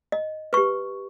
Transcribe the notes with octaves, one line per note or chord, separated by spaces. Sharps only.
D#5
G4 B4 C#6